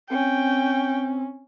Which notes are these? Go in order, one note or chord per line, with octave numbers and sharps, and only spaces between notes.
C4 C#4 G5